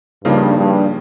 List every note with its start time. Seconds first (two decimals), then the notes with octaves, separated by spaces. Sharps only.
0.25 G2 C#3 F3 A#3 D#4
0.57 G2